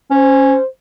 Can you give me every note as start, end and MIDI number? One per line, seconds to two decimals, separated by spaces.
0.11 0.55 61
0.11 0.65 72